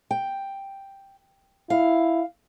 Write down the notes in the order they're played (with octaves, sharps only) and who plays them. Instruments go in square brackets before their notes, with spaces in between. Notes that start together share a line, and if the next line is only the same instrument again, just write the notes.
[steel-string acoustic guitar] G5
[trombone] E4 [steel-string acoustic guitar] F5